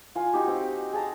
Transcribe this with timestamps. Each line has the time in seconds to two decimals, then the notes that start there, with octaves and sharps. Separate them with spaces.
0.15 F4 G#5
0.33 D#4 F#4 G4
0.47 C4
0.93 G#4 A5 A#5